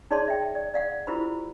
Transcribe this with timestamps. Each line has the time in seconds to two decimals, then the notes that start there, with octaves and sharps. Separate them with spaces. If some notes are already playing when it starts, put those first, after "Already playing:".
0.11 D#4 G#4 C#5 D5 A5 C6
0.28 E5 G5
0.55 D5
0.74 D5 F5 F#5
1.07 E4 F4 G4 A#4 C5 B5